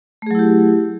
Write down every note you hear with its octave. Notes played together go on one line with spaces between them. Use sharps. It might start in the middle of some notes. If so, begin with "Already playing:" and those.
F#3 A3 E4 G4 G#4